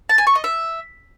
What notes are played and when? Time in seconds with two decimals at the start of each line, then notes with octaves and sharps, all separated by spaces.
0.09 A5
0.18 G#5
0.27 C#6
0.35 D#5
0.44 E5